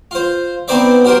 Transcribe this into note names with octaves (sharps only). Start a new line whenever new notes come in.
F4 C5
B3 C4 D#4 C5 D5 E5
F#4 G4 A#4 C5